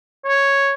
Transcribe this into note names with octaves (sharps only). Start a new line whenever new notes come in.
C#5